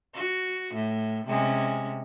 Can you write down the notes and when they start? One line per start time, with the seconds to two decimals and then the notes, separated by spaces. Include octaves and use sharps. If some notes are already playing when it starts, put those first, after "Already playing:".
0.14 F#4
0.74 A2
1.27 C3 G#3 C#4